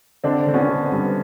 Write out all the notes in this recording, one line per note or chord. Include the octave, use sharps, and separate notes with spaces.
D3 C4 D4
D3 C4
B3 C#4
D3
C4
G2